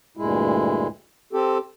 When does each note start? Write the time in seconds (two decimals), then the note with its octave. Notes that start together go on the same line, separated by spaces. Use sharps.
0.17 D2 G2 A#2 G#3 E4
1.33 C4 G4 A4